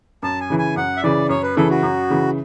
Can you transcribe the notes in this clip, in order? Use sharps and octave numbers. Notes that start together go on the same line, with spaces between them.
F#2 A5
G#5
C#3 E3
G#5
F#2 F#5
E5
C#3 E3 D5
F#2 C#5
B4
C#3 E3 A4
F#4
F#2
C#3 E3